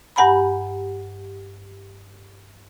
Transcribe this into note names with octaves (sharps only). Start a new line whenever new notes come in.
G2 G4 F#5 G#5 A#5 B5